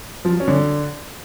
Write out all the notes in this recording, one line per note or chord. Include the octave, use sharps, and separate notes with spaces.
F3
F#3
C#4
D3